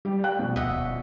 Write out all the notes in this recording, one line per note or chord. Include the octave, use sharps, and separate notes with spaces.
G3 G4
F5 G5 F#6
A#1 B2
D2 D#5 E5 F#5
D#1